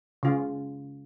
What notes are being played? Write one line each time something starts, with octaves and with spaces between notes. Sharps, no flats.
C#3 F4